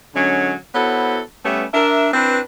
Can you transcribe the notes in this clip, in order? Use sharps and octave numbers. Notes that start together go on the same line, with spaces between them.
D3 F#3 G#3 C#4
B3 E4 F#4 A4 C5 C#5
G3 A3 B3 C#4 B4 E5
D4 A#4 E5
C4 D4 E4 B4